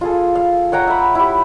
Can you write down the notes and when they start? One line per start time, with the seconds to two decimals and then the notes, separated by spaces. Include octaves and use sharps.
0.01 F4 G#4 A4
0.35 F5
0.72 C#5 F#5 G5 A#5
0.87 E5 B5
1.15 E4 G4